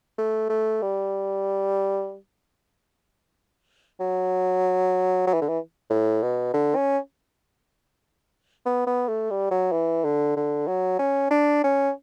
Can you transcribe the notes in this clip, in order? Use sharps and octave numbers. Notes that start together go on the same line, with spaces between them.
A3
A3
G3
F#3
F#3
E3
D3
E3
A2
B2
D3
C#4
B3
B3
A3
G3
F#3
E3
D3
D3
F#3
C#4
D4
C#4